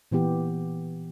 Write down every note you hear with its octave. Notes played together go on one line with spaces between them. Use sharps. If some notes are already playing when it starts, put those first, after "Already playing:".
A#2 E3 B3 G4